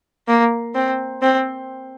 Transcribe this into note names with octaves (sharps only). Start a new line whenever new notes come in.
A#3
C4
C4